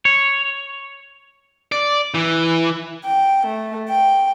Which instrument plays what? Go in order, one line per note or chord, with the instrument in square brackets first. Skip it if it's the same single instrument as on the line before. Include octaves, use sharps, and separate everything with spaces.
[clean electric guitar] C#5
[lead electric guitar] D5
E3
[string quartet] G5
A3
G5